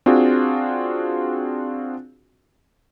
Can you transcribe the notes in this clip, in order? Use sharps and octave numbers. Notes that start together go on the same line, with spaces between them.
C4 D4 F4 F#4 G#4